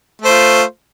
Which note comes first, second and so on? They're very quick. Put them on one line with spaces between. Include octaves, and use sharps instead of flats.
A3 C5 F4